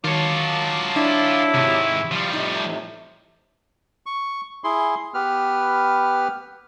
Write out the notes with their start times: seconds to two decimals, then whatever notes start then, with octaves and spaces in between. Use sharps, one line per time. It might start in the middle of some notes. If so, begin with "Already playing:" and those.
0.04 D#3 F#3 F4 C#5 A5 D6
0.96 D4 E4
1.54 G#2 C3 D#3
2.11 F3 G3 F5
2.33 A2 C3 D#4
4.06 C#6
4.64 E4 G#4 C6
5.14 B3 G4 B4 F6